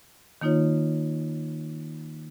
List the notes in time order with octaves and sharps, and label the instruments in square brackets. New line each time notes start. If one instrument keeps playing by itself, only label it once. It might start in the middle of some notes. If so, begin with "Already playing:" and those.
[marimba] D#3 A#3 D#4 F4 C#5